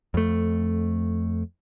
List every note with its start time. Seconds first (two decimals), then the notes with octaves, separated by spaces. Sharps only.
0.14 F2 A3